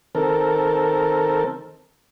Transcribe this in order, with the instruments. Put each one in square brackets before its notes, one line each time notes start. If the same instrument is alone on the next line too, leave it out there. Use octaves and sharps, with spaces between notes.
[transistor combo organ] D#3 C4 A4 A#4